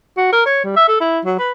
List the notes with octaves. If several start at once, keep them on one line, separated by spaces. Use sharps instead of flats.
F#4
A#4
C#5
G3
E5
A4
E4
F#3
B4